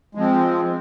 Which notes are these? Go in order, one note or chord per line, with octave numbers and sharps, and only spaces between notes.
F3 G#3 C4